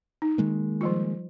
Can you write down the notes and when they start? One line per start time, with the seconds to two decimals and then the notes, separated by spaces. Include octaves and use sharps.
0.22 D#4
0.38 D#3 G#3 A#3
0.81 F3 G3 F4